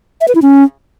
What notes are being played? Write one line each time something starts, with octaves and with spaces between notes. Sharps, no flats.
E5
B4
E4
C#4